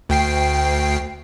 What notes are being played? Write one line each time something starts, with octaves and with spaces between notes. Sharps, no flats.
D2 G5 C7